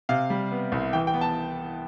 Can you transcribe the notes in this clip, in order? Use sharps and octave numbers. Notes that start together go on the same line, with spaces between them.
C3 F5
G3
B3
C2
E3 G5
G5
B3
A5